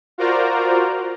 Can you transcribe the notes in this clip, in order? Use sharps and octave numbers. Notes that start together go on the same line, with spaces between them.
F4 F#4 A#4 C5 D5 A#5